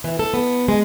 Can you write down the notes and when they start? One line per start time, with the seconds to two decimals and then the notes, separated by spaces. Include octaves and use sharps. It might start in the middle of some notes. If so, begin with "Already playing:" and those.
0.04 E3
0.19 A4
0.34 B3
0.68 G#3